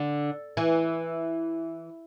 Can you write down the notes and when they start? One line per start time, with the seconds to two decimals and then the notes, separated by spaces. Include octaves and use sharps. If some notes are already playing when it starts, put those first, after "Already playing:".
Already playing: D3
0.57 E3